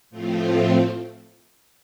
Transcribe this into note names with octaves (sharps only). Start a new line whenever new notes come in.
A2 F3 A3 C4 F4